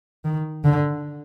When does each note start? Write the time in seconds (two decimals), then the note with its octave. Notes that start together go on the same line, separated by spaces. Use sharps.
0.25 D#3
0.64 D3